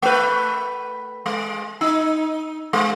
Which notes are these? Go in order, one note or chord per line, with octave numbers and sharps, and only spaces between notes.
A3 B4
G#3
D#4
G#3